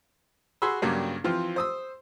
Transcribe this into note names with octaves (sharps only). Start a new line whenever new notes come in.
F#4 G#4 B5 C6 E6
G2 C#3 F#3 G3 A#3 D4
E3 F3 C4 F4
C5 D#6 E6